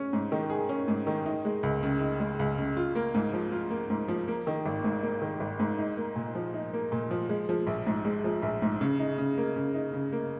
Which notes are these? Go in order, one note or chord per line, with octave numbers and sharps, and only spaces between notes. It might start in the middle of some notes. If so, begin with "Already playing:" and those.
Already playing: C#4
G#2
D#3
G#4
C#4
G#2
D#3
D#4
G#3
C#2
C#3
D#4
G#3
C#2
C#3
F4
A#3
G#2
F3
F4
A#3
G#2
F3
A#3
D#3
G#1
G#2
A#3
D#3
G#1
G#2
D#4
A#3
A#2
F3
D#4
A#3
A#2
F3
G#3
F3
A#1
G#2
G#3
F3
A#1
G#2
C#3
D#4
C#3
A#3
C#3
D#4
C#3
A#3